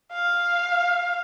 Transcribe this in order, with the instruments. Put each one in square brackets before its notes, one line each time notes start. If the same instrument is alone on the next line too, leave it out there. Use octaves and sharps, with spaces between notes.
[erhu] F5